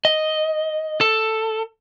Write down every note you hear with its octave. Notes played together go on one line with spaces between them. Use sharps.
D#5
A4